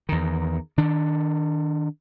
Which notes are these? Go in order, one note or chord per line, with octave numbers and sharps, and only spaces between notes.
E2 D#3
D#3 D4